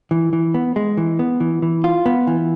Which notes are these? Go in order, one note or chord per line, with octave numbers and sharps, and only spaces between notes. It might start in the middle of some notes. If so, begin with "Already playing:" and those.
E3
E3
B3
G#3
E3
B3
E3
E3
F4
B3
E3